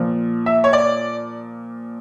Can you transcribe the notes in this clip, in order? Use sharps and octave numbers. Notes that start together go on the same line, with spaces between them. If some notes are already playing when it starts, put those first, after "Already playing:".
Already playing: A#2 F3
E5
C#5
D5